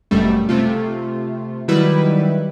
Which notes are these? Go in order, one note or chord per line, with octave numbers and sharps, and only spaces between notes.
G1 F#2 B2 G3 A3
C3 A3 F4
D#3 F#3 G3 E4 B4